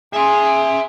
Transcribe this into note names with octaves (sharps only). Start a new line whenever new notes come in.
G#4 E5 C6